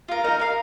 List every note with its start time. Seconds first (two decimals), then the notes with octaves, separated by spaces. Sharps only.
0.09 F4 A#4
0.24 D#4 A#4
0.40 A#4 F5